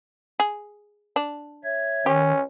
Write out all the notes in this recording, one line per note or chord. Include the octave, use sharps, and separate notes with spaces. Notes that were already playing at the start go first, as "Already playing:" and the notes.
G#4
D4
C#5 E5 G#6
D#3 C#4 G4